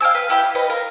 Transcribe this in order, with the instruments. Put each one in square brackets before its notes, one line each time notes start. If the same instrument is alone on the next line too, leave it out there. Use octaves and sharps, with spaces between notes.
[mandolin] F5 G5 G#5 E6
B4
E4 G4 G5 B5
F5
B4 D#5
A#4 F5